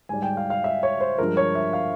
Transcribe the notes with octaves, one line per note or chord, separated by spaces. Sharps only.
G#2 G3 G#5
G5
F5
F5
E5
C#5
C5
G2 F3 G#3 A#4
C#5
E5
F5